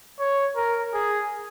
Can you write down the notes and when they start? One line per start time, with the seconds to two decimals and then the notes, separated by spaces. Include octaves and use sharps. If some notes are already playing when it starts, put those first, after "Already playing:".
0.19 C#5
0.56 A#4
0.94 G#4